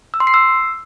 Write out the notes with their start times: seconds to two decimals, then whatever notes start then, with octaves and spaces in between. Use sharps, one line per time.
0.14 E6
0.20 C6
0.27 C7
0.34 E6